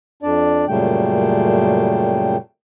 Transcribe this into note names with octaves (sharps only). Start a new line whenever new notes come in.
F2 D4 D5
F#2 A#2 C#3 G3 A3 G5